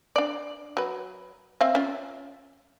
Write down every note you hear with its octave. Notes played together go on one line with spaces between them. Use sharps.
D4 D5
F#3 B4
C4 E5 F5
C#4 F4